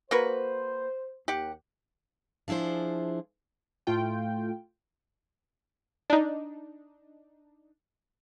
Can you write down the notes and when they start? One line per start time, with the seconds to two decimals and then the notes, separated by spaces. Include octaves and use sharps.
0.11 A#3 F#4 B4 C5
1.28 D#2 G4 F#5
2.48 F3 D4 E4 G#4 C5
3.87 A2 A3 F4 G5
6.10 D4 D#4